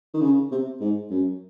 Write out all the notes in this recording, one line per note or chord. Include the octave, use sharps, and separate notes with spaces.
D#3
C#3
C3
G#2
F#2